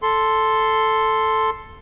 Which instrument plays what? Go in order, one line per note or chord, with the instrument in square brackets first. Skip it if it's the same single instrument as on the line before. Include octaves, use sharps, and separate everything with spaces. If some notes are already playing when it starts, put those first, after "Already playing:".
[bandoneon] A4 C6